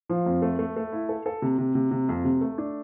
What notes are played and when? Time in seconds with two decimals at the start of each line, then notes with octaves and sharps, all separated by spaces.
0.09 F3
0.26 F2
0.42 A3
0.59 A3
0.76 A3
0.92 E4
1.09 A4
1.26 A4
1.42 C3
1.58 C3
1.75 C3
1.91 C3
2.09 F2
2.24 C3
2.41 A3
2.58 D4